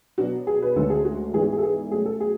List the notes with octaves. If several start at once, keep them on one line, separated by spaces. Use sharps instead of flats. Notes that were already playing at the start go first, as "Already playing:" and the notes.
B2 F#3 B3 D4 F#4
G#4
B4
D2 D3 G#3 C#4 A4
G#4
F#4
G#2 E3 B3 D4 G#4
F#4
G#4
A4
G#4
B2 F#3 A3 C#4 G#4
A4
G#4